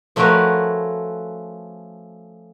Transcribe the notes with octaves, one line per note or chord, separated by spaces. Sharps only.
F3 A3 C#4 F#4 A#4 B4